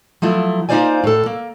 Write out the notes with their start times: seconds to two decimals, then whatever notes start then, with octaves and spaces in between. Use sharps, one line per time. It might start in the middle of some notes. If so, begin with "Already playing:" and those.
0.22 F3 F#3 A3 E4
0.69 A#3 D#4 F4 C5 D5 G#5
1.04 A2 A4
1.26 A#3